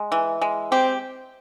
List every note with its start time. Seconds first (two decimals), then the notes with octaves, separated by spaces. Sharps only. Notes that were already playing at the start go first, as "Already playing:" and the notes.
Already playing: G#3
0.12 E3
0.42 G#3
0.71 C4 G4